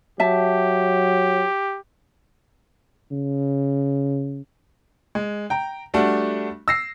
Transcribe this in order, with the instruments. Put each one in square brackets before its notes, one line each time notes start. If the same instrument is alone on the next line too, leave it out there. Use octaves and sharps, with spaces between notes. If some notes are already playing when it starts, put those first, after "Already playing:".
[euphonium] F#3 [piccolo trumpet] G4 [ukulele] E5 A5
[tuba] C#3
[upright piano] G#3
G5 A#5
G3 A3 D4 F#4
E6 A#6 C7